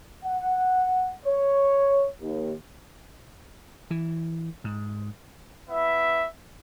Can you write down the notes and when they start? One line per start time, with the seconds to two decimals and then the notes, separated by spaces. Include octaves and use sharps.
0.24 F#5
1.26 C#5
2.21 D#2
3.91 E3
4.64 G#2
5.69 B3 E4 E5